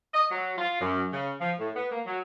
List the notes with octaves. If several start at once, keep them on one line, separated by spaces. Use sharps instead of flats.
D#5
F#3
F4
F#2
C#3
F3
A2
B3
A#3
F#3